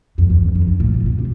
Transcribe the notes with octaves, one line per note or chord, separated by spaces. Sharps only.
F2
E2
F2
F2
G2
A2
A#2
A#2
C3